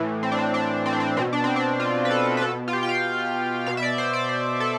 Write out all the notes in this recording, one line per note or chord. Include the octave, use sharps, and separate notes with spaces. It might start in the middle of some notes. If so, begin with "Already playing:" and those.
Already playing: A2 E3
C4
D4
C4
D4
C4
D4
C4
B2 C4
D4
C4
D4
F4
B4
A4
B4
B2 A4
F4
G4
G5
F5
B2 F5
E5
D5
C5
D5
C5
A4